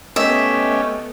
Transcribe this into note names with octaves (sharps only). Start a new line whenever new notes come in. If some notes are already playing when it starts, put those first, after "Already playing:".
A3 B3 C#4 G4 D#5 E5